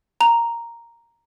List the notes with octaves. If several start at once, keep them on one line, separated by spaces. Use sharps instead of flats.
A#5 F7